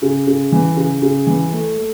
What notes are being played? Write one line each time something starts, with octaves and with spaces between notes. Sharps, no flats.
C#3
C#3
E3
C#3
C#3
E3
A3
A3